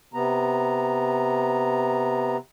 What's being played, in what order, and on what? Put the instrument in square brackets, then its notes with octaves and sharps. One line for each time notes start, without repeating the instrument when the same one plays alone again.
[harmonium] C3 B3 A#5